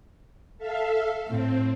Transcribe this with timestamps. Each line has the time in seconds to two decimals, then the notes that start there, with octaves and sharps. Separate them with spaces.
0.58 A4 E5 F5
1.28 A2 C4